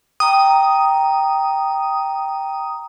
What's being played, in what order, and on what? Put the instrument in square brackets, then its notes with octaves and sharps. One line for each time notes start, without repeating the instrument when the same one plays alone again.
[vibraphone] G5 A#5 [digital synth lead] D#6